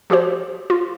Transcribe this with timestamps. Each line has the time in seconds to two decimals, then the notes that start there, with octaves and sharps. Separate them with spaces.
0.10 F3 F#4 G4 C5
0.70 F4